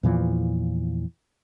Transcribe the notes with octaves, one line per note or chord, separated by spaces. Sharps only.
E2 A#2 E3 F3